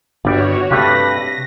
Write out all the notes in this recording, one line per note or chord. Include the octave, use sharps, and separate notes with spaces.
G1 D3 G3 C4 D4 F#4 C#5 G5
G2 C3 G3 A3 B4 A#6